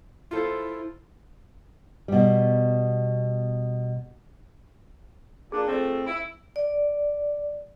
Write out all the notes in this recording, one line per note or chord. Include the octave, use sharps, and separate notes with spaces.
E4 F4 A4 C5
B2 G3
A#2 D4 G#4
F3 A3 C4
E4
D5